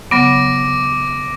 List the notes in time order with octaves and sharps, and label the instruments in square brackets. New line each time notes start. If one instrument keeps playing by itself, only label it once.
[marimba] C#3 F#3 B3 [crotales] D6 A#6 D7